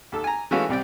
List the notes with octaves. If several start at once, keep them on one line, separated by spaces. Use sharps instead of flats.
D#2 A4
G#5 A#5
E3 G#3 A3 C#4 F4 F#4
C2 C3 D5 G5